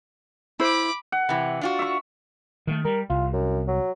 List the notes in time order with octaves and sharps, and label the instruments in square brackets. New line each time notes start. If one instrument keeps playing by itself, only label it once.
[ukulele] E4 C5 [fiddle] B5 D6
[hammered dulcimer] F#5
[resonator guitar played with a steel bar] C3 E3
D4 F4 F#4
[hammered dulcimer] E5 C#6
[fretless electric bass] D#3 F#3 A3
[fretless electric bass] G3 [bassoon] A#4
[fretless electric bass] C2 [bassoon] F4
[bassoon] F#2
F#3